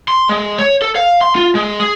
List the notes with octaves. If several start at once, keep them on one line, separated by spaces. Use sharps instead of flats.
C6
G#3
C#5
A4
F5
C6
F4
G#3
G#4